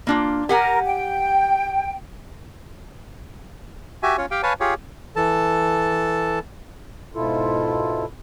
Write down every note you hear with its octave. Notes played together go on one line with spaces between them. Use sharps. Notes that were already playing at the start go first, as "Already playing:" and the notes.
A#3 D4 F4
G4 A#4 F#5 G#5
G5
F#4 G4 E5 G#5
C#4 F4 C#5
G4 F5 G5
B4 C#5 F5 G#5 A5
F4 G4 G#4 C#5
E3 A4 A5
G#2 B2 E4 F4 A4